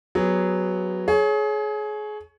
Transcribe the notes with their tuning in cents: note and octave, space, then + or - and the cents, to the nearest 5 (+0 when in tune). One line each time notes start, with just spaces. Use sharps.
F#3 +0 B3 +0 G#4 -25
G#4 +30 C#5 +0